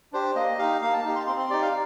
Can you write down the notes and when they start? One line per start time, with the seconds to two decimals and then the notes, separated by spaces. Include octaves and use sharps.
0.13 D4 G4 C5
0.36 A#3 D#5
0.59 D#4 G4 F5
0.82 A#3 F5
0.93 A5
1.05 D#4 G4
1.16 C6
1.27 C4 C6
1.39 C6
1.50 D#4 G4 D5
1.62 F5